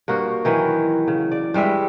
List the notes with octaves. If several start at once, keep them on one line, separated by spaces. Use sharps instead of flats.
G2 A#3 F#4 C5
D#3 E3 F#3 B3
C#3
D5
G2 G3 G#3 E5